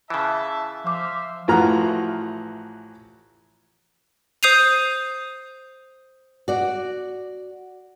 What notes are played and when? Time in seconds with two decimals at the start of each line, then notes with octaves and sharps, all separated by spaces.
0.10 C#3 E3 E5 A5
0.84 F3 C5 E5 F5 D6
1.48 A1 E3 F3 F#4 A#5 F6
4.43 C5 D#6 G6 C7 D#7 F7
6.48 F#4 D5